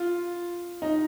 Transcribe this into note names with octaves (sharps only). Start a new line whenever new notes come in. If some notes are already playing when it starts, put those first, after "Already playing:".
Already playing: F4
D#4